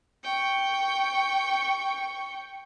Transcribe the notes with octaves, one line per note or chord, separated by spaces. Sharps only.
G5 C#6